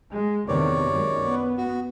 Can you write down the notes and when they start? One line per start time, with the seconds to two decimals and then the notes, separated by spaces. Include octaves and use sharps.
0.13 G#3
0.48 E2 C3 D#3 C#5 D5
0.89 F#2 D#3 G#3
1.22 B3
1.58 F#4